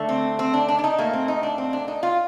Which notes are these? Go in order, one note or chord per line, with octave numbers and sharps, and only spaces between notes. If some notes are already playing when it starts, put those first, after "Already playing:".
Already playing: D3 A3
C4
C4
D4
D4
D4
D#4
A#2 A3 A#3
C4
D#4
D4
C4
D4
D#4
F4